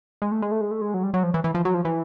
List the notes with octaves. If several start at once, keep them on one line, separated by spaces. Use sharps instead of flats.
G#3
A3
G#3
A3
G#3
A3
G#3
F#3
G3
F#3
F3
E3
E3
F3
F#3
F3
E3